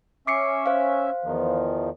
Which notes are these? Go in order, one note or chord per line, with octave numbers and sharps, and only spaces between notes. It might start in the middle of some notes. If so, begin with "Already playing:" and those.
C#4 E5 D6 C7 C#7
C5 F5
E2 D#3 F3